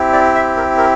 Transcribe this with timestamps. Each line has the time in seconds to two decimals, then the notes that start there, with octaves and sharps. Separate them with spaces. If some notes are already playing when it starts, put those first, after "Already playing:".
Already playing: C4 E4 G4
0.13 D5
0.34 E5
0.57 A#4
0.77 A#4